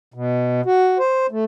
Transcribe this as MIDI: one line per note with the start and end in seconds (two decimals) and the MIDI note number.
0.14 0.61 47
0.66 0.98 66
0.99 1.27 72
1.31 1.44 57